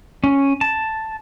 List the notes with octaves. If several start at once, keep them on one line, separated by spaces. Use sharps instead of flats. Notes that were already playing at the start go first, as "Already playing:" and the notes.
C#4
A5